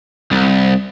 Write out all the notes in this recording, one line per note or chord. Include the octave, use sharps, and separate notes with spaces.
C2